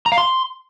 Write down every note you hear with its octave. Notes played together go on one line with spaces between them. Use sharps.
A#5
F5
C6